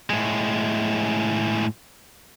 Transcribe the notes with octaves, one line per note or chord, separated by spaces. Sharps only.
A2 G#3